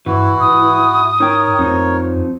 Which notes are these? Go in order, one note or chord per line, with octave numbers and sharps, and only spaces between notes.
G2 E3 E4 F#4
G#2 D#6
D#4 A#4 C#5 G5
F2 F3 C4 D#4